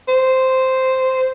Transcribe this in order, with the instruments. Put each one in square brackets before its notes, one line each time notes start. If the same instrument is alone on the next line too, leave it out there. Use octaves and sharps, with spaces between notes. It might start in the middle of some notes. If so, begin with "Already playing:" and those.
[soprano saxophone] C5